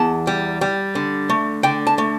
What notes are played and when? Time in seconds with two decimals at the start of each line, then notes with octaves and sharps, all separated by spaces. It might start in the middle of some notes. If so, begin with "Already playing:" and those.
Already playing: E2 A5
0.27 G3
0.61 G3
0.95 D3
1.30 A3
1.63 D3 G5
1.87 A5
1.98 A3